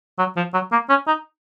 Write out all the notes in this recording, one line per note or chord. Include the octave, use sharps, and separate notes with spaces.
F#3
F3
F#3
A#3
C#4
D#4